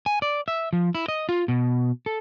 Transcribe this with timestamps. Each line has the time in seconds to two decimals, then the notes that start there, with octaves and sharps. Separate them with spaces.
0.06 G#5
0.22 D5
0.48 E5
0.73 F3
0.95 E4
1.08 D#5
1.29 F4
1.48 B2
2.06 A4